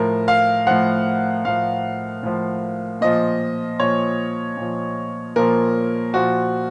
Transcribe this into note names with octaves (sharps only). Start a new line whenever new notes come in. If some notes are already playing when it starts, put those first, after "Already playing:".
Already playing: A2 F3 A#4
F5
A2 F3 F#5
A2 F3 F5
A2 F3
A#2 F3 D#5
A#2 F3 C#5
A#2 F3
A#2 F3 A#4
A#2 F3 F#4